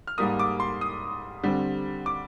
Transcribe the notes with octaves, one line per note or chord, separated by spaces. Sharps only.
F6
G#2 G3 A#3 D#6
D6
C6
D#6
D3 G3 C4
D6